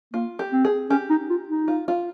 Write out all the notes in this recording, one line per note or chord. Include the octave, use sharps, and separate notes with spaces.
A#3 F4
G4
C4
G#4
C#4 G4
D#4
F4
D#4
F4
F4